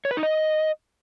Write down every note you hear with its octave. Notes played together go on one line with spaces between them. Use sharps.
C#5
B4
D#4
D#5